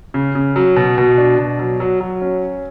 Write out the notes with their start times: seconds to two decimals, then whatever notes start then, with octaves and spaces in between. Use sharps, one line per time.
0.14 C#3
0.35 C#3
0.56 F#3
0.76 B2
0.98 B2
1.18 D4
1.38 B2
1.59 F#3
1.80 F#3
2.01 F#3
2.22 C#4